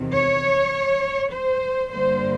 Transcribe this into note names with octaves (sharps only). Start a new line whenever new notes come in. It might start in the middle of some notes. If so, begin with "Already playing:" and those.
Already playing: E2 C3 D#3
C#5
C5
G2 D3 G3 A#3 C5